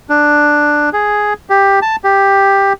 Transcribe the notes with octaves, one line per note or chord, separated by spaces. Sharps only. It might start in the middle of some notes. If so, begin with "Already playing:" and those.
D4
G#4
G4
A5
G4